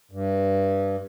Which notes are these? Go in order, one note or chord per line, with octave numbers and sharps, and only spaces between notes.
G2